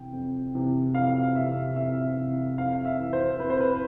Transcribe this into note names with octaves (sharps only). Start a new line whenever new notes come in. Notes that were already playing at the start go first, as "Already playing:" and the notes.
Already playing: C3 E3 G5
F2
C3 E3
F2 F5
C3 E3 E5
F2 E5
C3 E3
F2 F5
E5
E3
C5
F2 B4
C5
B4